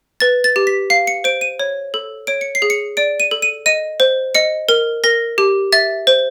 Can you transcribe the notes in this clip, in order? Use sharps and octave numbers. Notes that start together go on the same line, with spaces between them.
B4 A6
A6
G4
B6
F5 C7
C#7
C5 D7
D#7
C#5
A4
C#5 D7
C#7
C7
G#4
C#7
D5 D7
D#7
A4
D#7
D#5 D#7
C5
D#5 C#7
A#4
A#4 A#6
G4
E5 A6
C5